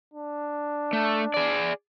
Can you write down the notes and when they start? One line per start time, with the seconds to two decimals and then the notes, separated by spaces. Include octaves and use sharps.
0.14 D4
0.93 A3
1.34 G#4 D5